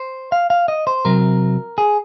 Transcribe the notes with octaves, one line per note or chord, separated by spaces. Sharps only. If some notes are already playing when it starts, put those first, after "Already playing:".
Already playing: C5
F5
F5
D#5
C5
C3 F#3 C4 A#4
G#4